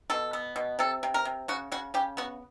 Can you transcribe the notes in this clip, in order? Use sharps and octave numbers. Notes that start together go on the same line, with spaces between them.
B2 A4
B3
B2
C3 A4
C3
A#4
C3
C#3 F#4
C#3 F#4
C#3 G4
B3 F#4